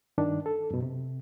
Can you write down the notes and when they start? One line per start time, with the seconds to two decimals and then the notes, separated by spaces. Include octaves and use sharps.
0.18 G2 D#3 D4
0.46 A4
0.71 F#2 B2
0.83 C3